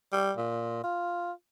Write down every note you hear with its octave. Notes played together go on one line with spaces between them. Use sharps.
G3
A#2
F4